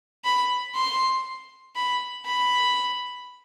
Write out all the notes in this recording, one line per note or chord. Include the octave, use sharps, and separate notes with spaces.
B5
C6
B5
B5